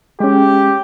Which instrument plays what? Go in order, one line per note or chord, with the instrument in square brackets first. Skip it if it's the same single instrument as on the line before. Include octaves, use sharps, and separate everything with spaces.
[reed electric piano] G#3 C#4 [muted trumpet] G4